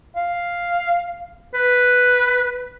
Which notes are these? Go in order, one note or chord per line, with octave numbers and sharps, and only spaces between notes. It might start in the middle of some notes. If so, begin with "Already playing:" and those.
F5
B4